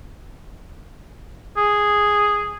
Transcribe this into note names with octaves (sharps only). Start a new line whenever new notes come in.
G#4